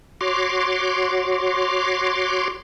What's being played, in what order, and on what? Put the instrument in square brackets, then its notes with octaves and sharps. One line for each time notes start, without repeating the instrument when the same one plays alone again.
[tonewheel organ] F#4 C#5 C6 D6